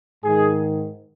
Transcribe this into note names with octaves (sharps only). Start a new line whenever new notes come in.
G#2 D#3 G#4